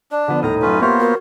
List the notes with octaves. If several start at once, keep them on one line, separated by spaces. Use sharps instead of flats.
D4 D5
D3 F3 B3
D#1 A2 D#4 A4 A#5 F6
F#2 A2 C#4 F4 B4
A#3 B3 F4 G4 A#4 C5 C#5 E5
F#4 A#4